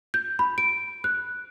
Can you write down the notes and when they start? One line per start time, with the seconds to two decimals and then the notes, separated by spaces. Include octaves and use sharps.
0.14 G6
0.39 B5
0.58 D7
1.04 F#6